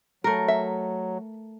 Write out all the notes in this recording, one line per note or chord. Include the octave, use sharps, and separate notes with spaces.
F#3 A3 A#4
E5